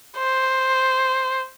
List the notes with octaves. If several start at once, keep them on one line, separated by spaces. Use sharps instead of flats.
C5